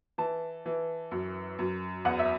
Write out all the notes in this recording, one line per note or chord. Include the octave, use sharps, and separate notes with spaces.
E3 A5
E3
F#2
F#2
E2 F#5
E5